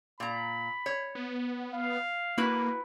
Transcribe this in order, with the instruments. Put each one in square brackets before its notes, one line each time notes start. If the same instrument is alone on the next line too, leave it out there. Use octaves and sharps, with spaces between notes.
[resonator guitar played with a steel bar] A#2 A#5 [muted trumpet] B5
[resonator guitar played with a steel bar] C#5
[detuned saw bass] B3
[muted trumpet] F5
[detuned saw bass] A#3 [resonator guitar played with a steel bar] E4 F#4 B4